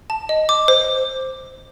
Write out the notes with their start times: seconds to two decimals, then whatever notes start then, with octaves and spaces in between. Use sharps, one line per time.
0.10 A5
0.29 D#5
0.49 D6
0.68 C5